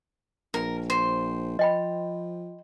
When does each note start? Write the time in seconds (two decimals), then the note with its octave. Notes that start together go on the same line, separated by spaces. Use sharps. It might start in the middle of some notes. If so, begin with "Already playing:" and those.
0.54 A#1 A#4
0.90 C5
1.59 F3 D#5 G5 B5